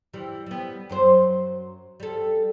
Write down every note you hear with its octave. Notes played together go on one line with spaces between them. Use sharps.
E3 G3
G3 B3
F#2 F#3 C5
G3 A4